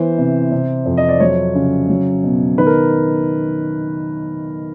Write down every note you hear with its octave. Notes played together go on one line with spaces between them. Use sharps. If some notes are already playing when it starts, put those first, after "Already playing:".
Already playing: E3 B3 C5
C3
C3
F2
D#5
D5
F#3 C#5
C#3
F#3
B2
D#3 B4
A#4